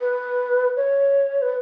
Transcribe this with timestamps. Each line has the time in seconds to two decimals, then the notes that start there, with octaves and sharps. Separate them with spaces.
0.01 B4
0.76 C#5
1.42 B4